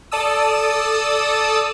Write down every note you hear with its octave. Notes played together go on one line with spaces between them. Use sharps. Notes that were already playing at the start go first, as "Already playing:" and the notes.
A4 D5 A5 D#6 E6